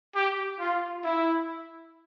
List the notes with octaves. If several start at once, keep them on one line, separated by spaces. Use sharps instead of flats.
G4
F4
E4